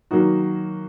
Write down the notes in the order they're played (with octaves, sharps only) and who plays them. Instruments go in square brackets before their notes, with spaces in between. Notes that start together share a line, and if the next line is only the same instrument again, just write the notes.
[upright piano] D#3 F#3 A#3 D#4 F#4